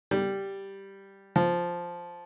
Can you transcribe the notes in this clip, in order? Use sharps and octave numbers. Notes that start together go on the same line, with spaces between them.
G3
F3